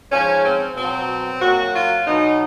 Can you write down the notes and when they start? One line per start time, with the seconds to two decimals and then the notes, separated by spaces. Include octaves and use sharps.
0.11 G#2 F3 C#4
0.44 C4
0.76 B2 F#3 C4
1.41 A#2 F#3 F#4
1.74 F4
2.06 B2 F#3 D#4